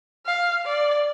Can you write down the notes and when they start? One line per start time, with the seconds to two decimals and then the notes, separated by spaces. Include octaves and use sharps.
0.26 F5
0.66 D5